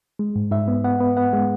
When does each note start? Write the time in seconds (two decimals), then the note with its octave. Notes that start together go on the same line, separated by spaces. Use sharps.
0.19 G#3
0.36 G#2
0.51 G#2 E5
0.68 B3
0.84 B3 F#5
1.01 B3
1.17 B3 F#5
1.33 G#3